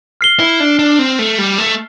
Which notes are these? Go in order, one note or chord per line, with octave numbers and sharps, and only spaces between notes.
F6 C7 G7
E4
D4
D4
C4
A3
G3
A3